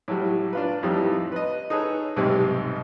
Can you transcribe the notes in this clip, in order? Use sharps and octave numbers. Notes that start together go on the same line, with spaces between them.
A2 F#3 G3
D4 F4 B4
F2 A2 E3 G3 D#4
B4 D#5
D#4 G#4 A4 B4 C#5
B1 G#2 C3 G3